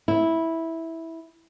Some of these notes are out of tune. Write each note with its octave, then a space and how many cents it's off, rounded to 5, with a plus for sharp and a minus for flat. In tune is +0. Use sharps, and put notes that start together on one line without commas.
E4 -10